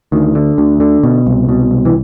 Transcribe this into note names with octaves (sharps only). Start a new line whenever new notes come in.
D2 D#3
D3
D2
D3
B2
C2
B2
C2
E3